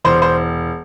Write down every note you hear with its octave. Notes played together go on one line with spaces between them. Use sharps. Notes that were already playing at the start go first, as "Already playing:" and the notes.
E1 C5
C5